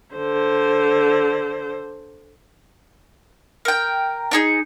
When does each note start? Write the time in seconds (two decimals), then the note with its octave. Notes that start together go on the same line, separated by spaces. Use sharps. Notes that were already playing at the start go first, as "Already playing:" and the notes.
0.15 D3 C5
3.65 A#4 G5
4.31 D4 D#4 G#4